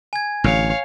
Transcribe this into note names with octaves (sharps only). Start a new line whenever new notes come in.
G#5 G#6
A1 D3 C#5 F5